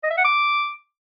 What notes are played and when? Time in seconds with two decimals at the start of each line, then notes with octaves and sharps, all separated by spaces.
0.04 D#5
0.11 E5
0.18 F#5
0.25 D6